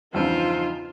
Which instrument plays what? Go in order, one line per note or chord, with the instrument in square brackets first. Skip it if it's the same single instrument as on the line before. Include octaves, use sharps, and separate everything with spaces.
[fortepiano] E2 G2 C#3 [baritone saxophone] F3 [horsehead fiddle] D#4 [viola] F4